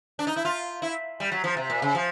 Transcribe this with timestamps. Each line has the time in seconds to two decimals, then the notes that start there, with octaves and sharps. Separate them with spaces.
0.19 D4
0.27 D#4
0.36 E4
0.45 F4
0.82 E4
1.20 G3
1.32 F#3
1.44 F3
1.57 C3
1.70 A#2
1.82 C#3
1.95 F3